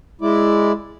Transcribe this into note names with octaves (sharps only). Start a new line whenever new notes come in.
G#3 E4 D5